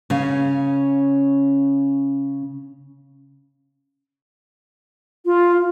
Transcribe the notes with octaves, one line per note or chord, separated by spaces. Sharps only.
C#3 C#4 F5
F4